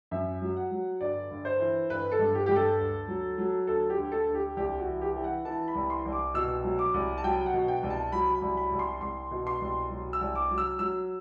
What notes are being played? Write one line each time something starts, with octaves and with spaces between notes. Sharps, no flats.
F#2 E5
F#3
F#5
F#3
G1 D5
G1
C5
E3
G1 B4
A4
G2
G4
G2 G4
A4
D2
F#3
F#3
D2 A4
G4
D2
A4
D2
G4
C2 G4
F#4
E3
G4
E3
F#5
E3 A5
B5
C2
C6
C2
D6
B2 E6
F#3
D6
C2
A5
F#3 G5
F#5
B2
G5
C2
A5
F#3 B5
B5
C2
B5
C2
C6
C2 C6
B2
C6
C2
F#3
E6
C2
D6
F#3
E6
F#3 E6